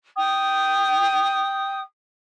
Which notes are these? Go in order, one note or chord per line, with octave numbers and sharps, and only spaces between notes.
G5 D#6